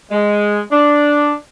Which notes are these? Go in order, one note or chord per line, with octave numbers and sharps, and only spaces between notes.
G#3
D4